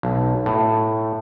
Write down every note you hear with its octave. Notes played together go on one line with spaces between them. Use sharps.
B1
A2